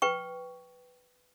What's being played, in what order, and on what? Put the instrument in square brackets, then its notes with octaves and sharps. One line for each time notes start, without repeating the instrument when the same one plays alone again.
[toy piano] B4 G5 C#6